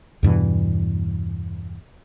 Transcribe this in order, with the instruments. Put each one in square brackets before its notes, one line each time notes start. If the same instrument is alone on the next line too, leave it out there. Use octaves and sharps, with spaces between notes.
[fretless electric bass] E2 G2 B2 E3